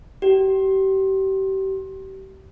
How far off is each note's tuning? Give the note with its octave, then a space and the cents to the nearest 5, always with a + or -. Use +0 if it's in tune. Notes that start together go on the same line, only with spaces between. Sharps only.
G4 -35